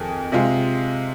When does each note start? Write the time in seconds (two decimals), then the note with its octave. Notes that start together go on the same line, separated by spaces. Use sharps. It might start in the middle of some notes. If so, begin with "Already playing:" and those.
Already playing: F2 D#3 G#4
0.32 C3 G#3 F4